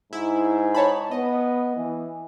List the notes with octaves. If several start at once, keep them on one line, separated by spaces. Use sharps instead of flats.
G#2 E4
C#5 A5 B5
B3 D#5
E3